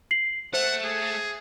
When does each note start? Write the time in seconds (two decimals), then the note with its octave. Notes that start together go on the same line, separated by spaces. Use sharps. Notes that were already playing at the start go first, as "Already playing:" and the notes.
0.11 C7 F#7
0.54 A3 C5 F#5
0.84 G#4